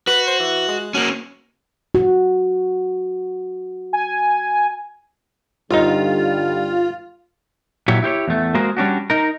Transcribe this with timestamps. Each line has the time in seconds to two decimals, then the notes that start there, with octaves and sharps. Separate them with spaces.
0.07 F#4 B4
0.27 C5
0.40 E3
0.68 G#3
0.94 A#3 C#4 F#4
1.95 F#4
3.93 G#5
5.71 G1 D3 G3 D#4 F4
7.88 A#2 F#3 E4 G4 C#5
8.03 E4 G4 C5 C#5
8.28 E2 A3
8.54 G#3 A#3 F#4 G#4 A#4 C5
8.77 G3 C#4 D4 F#4
9.10 D#4 A#4